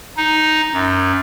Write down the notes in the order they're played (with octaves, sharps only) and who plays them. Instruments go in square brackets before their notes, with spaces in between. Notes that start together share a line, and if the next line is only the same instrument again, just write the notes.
[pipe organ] D#4
F#2